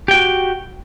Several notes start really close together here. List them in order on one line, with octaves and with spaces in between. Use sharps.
G4 G5 F#4